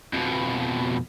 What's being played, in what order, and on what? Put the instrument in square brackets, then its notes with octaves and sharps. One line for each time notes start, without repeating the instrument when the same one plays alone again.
[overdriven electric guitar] F2 B2